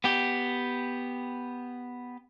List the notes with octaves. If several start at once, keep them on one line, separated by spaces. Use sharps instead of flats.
B3 G4